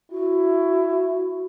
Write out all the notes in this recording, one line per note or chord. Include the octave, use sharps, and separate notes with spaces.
E4 F#4